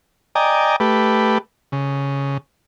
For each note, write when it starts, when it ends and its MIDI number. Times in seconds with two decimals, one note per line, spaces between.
0.35 0.76 74
0.35 0.76 75
0.35 0.76 79
0.35 0.76 80
0.35 0.76 82
0.80 1.38 57
0.80 1.38 67
0.80 1.38 71
1.72 2.38 49